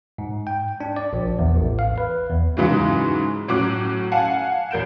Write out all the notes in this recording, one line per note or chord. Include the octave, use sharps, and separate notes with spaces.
G#2
G5
D4
D5
A#1
E2
A1
F5
B4
E2
G#2 C#3 E3 F#3
A2 F#3 C#4 D6 F#6
F5 F#5 G#5 A5
A1 A#4 G6 D7 E7